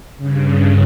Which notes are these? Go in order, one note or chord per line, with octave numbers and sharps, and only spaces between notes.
G2 C#3